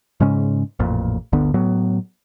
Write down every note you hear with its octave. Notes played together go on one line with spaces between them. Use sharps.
G#2 C#3 G#3 C#4
A1 F2 A#2
G1 D2 D3 B3
A2 F#3 B3